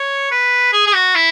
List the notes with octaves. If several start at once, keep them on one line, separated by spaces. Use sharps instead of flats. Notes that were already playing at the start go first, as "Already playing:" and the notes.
Already playing: C#5
B4
G#4
G#4
F#4
E4